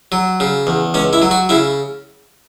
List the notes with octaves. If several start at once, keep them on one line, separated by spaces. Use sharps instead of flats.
F#3
C#3
E2
C#2 C#4
E4
F#3
F#4
C#3 E4